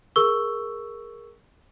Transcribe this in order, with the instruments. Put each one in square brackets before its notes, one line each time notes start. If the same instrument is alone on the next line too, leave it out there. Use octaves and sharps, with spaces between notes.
[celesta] G#4 A#4 C#6 E6 G7